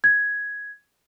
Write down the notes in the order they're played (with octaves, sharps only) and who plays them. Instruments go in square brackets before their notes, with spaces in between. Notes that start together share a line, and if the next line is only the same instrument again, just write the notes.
[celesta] G#6